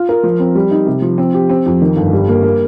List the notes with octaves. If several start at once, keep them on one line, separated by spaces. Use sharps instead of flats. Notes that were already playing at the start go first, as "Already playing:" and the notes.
Already playing: F4
A#4
F3
C4
G3
D#4
C3
F3
C4
G4
C4
F2
D#3
G1
G3
A#3
A#3